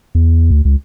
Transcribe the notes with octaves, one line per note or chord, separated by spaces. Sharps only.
E2
D2
C#2